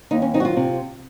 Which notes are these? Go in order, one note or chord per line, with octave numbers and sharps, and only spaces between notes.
D#2 D#4
C#4
D#3 F#3 C4 D#4
F#4
F4
C3